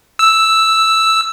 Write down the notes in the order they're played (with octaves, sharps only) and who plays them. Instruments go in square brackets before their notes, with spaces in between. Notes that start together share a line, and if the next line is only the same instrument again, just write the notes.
[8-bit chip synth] E6